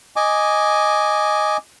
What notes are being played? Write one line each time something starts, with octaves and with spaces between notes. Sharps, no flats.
D#5 G#5 D6